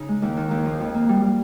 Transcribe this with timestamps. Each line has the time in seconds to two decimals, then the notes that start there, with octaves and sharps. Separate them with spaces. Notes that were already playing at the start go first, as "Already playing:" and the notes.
Already playing: C#3 D#4
0.08 G#3
0.22 D#2
0.37 D#3
0.51 D#2
0.65 F3
0.80 F2
0.94 A#3
1.09 G3
1.23 G3